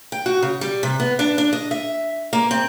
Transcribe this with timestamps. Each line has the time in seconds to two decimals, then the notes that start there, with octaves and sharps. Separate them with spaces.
0.12 G5
0.26 F#4
0.42 C#3
0.61 G3
0.83 C3
1.00 B3
1.19 D4
1.38 D4
1.53 D#5
1.71 E5
2.33 A#3
2.51 C4